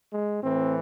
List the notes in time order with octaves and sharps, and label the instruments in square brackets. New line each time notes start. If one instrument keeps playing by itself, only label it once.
[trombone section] G#3
A2 E3 C4